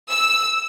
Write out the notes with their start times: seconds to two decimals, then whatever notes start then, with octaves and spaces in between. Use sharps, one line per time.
0.10 E6